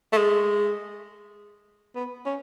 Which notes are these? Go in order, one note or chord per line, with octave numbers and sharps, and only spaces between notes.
A3
G#3
B3
C#4